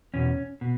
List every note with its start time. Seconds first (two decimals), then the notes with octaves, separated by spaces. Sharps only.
0.13 E2 B2 C#4
0.61 B2